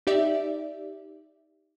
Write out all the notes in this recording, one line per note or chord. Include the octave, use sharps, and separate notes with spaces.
D#4 G4 D5 E5